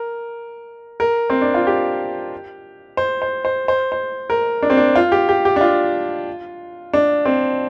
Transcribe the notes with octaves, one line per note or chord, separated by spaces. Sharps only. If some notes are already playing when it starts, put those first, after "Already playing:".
Already playing: A#4
A#4
C4
D4
F4
G4
C5
C5
C5
C5
C5
A#4
D4
C4
D4
F4
G4
G4
G4
D4
F4
D4
C4